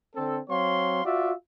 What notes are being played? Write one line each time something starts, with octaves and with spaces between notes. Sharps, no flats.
D3 C4 A4
F#3 C4 C#5 F5 C6
F4 F#4 D5 E5